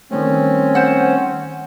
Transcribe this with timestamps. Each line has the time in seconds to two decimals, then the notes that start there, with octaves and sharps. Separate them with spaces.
0.11 D#3 G3 A3 C4 C#4
0.75 C5 F#5